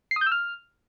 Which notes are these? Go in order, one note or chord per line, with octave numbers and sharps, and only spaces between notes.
C7
D#6
G6
E6
F6